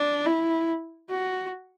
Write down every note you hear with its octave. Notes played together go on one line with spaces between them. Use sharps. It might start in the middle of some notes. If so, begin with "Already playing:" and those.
Already playing: D4
E4
F#4